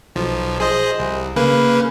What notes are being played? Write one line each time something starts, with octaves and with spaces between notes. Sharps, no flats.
B1 F3
G#4 C5 D#5
C2
C#3 A#3 B4